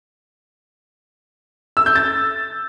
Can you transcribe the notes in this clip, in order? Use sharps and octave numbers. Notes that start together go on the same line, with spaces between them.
E6
G6
A6